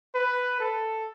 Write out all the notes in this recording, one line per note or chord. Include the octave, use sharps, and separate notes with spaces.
B4
A4